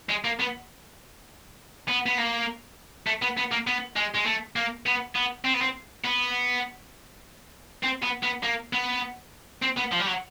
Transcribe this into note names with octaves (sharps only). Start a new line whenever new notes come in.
G#3
A#3
B3
B3
B3
A#3
A3
B3
B3
A#3
B3
G#3
G#3
A3
A#3
B3
B3
C4
B3
C4
B3
C4
B3
B3
A#3
B3
C4
B3
F3
G3
F#3